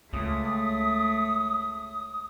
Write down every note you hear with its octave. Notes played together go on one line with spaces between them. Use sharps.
C#2 A3 D#6